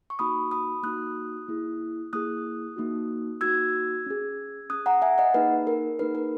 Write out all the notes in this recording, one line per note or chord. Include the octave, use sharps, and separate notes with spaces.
C#6
A#3 D#4 F#4 B5 D#6
B5 D#6
A#3 D#4 F#4 D#6 F#6
A#3 E4 G#4
A#3 E4 G#4 D#6 F#6
A#3 D#4 F#4
A#3 D#4 F#4 E6 G#6
C#4 G#4
C#4 G#4 D#6 F#6
F#5 A#5
E5 G#5
D#5 F#5
A#3 D#4 G#4 B4
A#4
A#3 D#4 G#4 B4
A#4